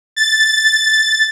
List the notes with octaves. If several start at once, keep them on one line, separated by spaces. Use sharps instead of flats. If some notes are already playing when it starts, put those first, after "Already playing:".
A6